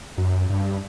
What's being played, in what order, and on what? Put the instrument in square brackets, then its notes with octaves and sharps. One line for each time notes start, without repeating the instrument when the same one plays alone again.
[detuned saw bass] F#2
G2